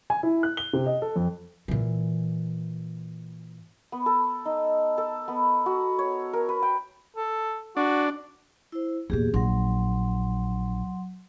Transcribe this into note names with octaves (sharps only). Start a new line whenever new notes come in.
G#5
E4
F#6
G7
C3
D#5
A4
F2
A#2 E3
B3
A4
D#4
A4
B3
F#4
C#5
A#4
B4
G5
A4
D4 F#4
E4 C5
E2 A#2 G4 G#4
A#1 F#3 F#5 C6